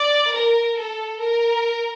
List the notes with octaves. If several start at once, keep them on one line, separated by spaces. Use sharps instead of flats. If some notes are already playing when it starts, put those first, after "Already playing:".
Already playing: D5
A#4
A4
A#4